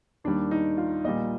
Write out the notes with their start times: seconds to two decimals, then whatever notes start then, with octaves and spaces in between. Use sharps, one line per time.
0.24 D#2 D#3 G3 D4
0.51 D#4
0.78 F4
1.05 A#1 A#2 G3 D#5